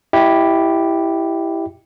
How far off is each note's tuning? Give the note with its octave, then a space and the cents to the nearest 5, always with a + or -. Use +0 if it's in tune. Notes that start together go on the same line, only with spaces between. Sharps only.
E4 +0 G4 +0 D#5 -30